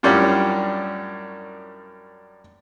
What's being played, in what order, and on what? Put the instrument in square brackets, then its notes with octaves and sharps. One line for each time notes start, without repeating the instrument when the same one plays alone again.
[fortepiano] F#2 A2 G3 C#4 D4 F4